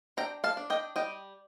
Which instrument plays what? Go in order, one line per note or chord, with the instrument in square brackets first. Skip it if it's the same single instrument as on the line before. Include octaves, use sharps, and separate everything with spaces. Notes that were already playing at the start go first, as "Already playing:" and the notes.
[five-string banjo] D4 G5 A#5
F5 A5
D4
D#5 G5
G3 D#5 G5